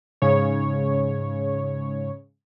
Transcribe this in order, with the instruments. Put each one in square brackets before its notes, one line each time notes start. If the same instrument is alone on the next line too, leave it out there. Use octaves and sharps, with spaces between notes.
[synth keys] G#2 C#3 C#5